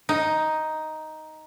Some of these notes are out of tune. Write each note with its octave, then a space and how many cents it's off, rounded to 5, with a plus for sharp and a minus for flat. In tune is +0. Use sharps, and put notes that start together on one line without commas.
D#4 +5